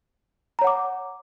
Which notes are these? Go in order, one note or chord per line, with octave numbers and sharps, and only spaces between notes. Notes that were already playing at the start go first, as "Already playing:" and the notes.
C#5 F#5 A#5 D6